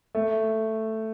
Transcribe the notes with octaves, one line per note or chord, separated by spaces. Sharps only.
A3